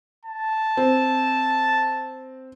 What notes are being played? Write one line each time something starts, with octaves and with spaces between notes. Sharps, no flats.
A5
C4